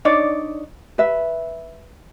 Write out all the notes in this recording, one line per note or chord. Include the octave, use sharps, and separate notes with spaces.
D4 D#4 C#5 D5
B4 E5